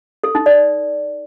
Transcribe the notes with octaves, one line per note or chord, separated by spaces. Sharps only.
A4
D#4
D5